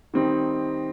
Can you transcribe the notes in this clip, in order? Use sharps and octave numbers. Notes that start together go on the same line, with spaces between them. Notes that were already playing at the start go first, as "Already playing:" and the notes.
D#3 G3 C4 D#4